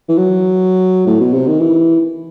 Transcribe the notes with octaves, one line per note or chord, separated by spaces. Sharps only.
E3
F#3
A2
B2
C3
D#3
E3